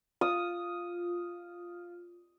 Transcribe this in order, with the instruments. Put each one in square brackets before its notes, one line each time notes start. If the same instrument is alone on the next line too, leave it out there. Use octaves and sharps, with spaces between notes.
[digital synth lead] F4 [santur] D#6